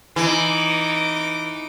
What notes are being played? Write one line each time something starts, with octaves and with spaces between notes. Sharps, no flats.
E3 D#4 D6